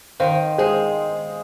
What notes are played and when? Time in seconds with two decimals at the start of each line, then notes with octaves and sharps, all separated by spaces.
0.20 D#3 C5 F5
0.58 G#3 G#4 C5